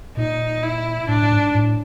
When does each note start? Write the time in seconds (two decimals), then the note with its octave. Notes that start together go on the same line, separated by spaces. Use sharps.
0.17 A#2 D#4
0.63 E4
1.08 A2 D4
1.22 A2
1.32 G#2
1.55 A2